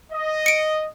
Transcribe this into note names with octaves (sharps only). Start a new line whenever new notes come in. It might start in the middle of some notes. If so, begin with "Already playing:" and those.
D#5
C#7 D7